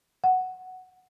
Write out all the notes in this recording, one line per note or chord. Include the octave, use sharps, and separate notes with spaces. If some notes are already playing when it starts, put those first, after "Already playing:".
F#5